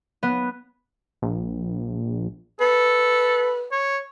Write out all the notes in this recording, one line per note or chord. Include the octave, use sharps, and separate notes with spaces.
B3
A#1
A4 B4
C#5